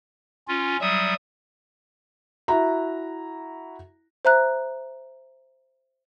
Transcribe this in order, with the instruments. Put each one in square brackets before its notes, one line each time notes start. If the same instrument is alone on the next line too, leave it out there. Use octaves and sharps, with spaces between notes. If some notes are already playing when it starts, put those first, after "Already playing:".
[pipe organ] C#4 F4
[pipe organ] F#3 G3 [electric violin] E5 D#6
[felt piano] E4 F#4 A#5
[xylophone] C5 E5 A#5 F#6